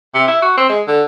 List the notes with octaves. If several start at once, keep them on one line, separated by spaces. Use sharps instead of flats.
C3
E4
F#4
C4
G#3
D3